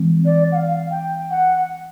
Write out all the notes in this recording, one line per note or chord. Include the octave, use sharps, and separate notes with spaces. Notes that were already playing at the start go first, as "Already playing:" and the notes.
Already playing: E3 G#3 C4
D5
F#5
F5
G5
F#5